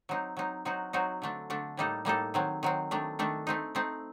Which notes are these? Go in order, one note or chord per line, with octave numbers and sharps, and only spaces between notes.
F#3 C4 D#4
F#3 C4 D#4
F#3 C4 D#4 F#4
F#3 C4 D#4 F#4
D3 A3 D4
D3 A3 D4
A2 G3 A#3 D#4 A4
A2 G3 A#3 D#4 A4
D#3 F#3 C4
D#3 F#3 C4
D#3 A3 D4
D#3 A3 D4
A3 C4 D#4
A3 C4 D#4